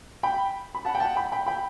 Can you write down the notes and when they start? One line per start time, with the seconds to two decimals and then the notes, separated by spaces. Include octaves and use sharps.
0.23 G5 B5
0.75 B5
0.85 F#5 A5
0.95 G5
1.00 F#5 A5
1.16 G5 B5
1.32 G5 B5
1.46 G5 B5